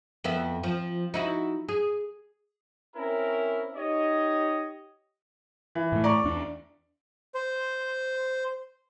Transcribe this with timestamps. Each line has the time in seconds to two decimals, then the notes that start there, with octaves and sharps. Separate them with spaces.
0.24 F2 B3 E4
0.63 F3
1.14 D#4 E4 F#4
1.69 G#4
2.96 C4 C#4 E4 A#4
3.75 D#4 G4 C#5 D#5
5.75 E3
5.92 A2 A3
6.04 D5 A#5 C#6
6.24 E2 D4
7.34 C5